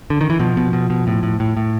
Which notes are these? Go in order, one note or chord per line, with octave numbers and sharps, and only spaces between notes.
D3
D#3
E3
B2 F3
B2
B2
B2
A2
A2
A2
A2